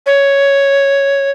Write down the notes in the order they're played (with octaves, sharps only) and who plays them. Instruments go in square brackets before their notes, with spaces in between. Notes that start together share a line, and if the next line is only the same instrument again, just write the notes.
[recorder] C#5